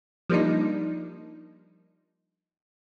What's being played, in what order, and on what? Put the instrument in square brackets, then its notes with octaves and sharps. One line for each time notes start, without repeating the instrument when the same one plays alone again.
[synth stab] F3 G3 A#3 D4 D#4